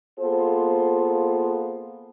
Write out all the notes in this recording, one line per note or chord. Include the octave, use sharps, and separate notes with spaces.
A#3 B3 F4 G#4 A4 C5